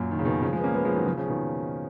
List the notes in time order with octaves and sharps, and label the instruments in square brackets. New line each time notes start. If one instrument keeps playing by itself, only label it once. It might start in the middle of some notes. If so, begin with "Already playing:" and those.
Already playing: [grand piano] F#2 A#2
D#3
C#3
B2 D#3
C#3 F3
F3 G#3
B3
A#3 C#4
G#3 B3
F3 G#3
D#3 F#3
C#3 F3
C#3 F3
B2 D#3